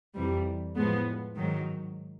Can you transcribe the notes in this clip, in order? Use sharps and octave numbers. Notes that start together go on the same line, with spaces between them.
F2 C3 E3 G3
A2 F3 G#3 B3
G#2 D#3 F#3